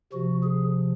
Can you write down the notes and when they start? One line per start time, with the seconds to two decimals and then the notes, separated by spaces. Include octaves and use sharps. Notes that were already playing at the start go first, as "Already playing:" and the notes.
0.13 C3 F3 F#4
0.43 G#4